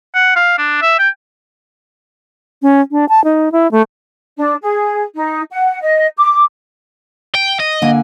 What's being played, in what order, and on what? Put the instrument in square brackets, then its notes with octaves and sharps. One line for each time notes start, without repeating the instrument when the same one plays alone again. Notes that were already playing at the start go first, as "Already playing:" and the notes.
[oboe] F#5
F5
D4
E5
G5
[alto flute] C#4
D4
A5
D#4
E4
A3
[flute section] D4
G#4
D#4
F#5
D#5
D6
[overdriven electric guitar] G5
D#5
[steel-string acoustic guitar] D3 A#3 G#5